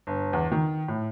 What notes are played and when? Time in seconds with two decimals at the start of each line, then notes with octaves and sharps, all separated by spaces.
0.07 G1
0.33 E2
0.52 D#3
0.88 A2